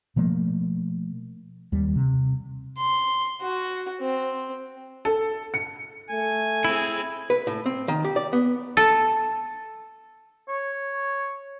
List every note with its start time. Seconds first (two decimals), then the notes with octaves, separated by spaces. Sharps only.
0.16 B2 F3 A3 A#3
1.72 D#2 G3
1.96 C3
2.77 C6
3.41 F#4
4.01 C4
5.05 A4
5.54 C#7
6.11 A3 G#5
6.65 C4 E4 G#4
7.30 B4
7.47 A2
7.66 C4
7.88 D#3
8.05 G4
8.16 D5
8.33 B3
8.77 A4
10.49 C#5